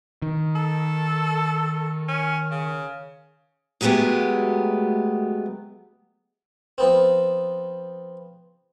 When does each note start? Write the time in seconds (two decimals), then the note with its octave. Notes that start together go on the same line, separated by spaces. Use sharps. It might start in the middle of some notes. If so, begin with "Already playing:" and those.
0.22 D#3
0.55 A4
2.08 C#4
2.51 C#3
3.81 D2 F#3 G#3 A3 B3 G4
6.78 F3 B3 C4